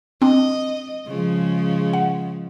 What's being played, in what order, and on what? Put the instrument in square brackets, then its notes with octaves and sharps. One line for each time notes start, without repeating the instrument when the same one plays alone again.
[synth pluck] C4 D4 [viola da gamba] D#5
[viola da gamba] C#3 F3 G#3
[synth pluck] F#5